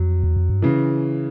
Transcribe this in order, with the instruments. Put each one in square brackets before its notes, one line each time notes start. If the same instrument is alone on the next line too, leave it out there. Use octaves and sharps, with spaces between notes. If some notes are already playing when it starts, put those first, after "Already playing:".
Already playing: [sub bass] F2 [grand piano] F#3
[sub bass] E2
F2
G2
[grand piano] C#3 E3